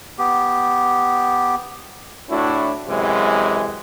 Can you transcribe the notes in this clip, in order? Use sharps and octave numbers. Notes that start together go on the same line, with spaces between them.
B3 G4
A2 D4 E4 F#4
F#2 C3 E3 G#3